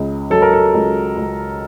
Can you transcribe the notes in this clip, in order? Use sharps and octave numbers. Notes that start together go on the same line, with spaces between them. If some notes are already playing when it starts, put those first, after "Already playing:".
Already playing: C#2 C#3
F#3 A4
A#4
A4
C#2
C#2